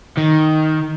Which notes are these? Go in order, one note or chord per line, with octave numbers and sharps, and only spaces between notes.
D#3